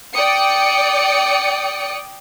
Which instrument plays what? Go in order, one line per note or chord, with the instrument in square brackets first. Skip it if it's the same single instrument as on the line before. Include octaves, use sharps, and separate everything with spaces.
[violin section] D5 G5 D#6 C#7